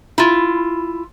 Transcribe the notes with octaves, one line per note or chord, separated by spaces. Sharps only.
E4 F4